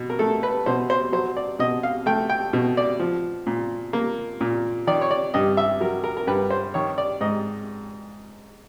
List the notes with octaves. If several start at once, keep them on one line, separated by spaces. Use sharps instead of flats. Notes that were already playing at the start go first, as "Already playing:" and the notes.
Already playing: B2
A#4
A3 A4
B4
B2 C5
C5
F#3 C5
D5
B2 D#5
F5
A3 G5
G5
B2
D5
F3
A#2
A#3
A#2
D#3 D5
C#5
D5
G2 D#5
E5
F#3 A#4
A#4
A#4
G2 B4
C5
D#3 C#5
D5
G#2 D#5